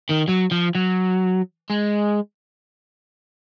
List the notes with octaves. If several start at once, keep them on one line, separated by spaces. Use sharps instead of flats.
D#3
F#3
F3
F#3
G#3